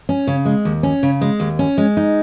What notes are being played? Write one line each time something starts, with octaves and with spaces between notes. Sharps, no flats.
C#4
C#3
G#3
D#2
C#4
C#3
G#3
D#2
C#4
G#3
D#4